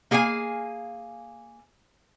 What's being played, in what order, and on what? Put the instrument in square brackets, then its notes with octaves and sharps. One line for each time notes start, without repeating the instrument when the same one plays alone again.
[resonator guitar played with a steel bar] A#3 G#4 F5 F#5 G#5